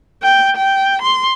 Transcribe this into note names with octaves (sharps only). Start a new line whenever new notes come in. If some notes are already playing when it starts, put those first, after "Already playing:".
G5
G5
C6